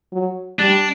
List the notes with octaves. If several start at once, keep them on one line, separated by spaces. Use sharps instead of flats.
F#3
G3 D4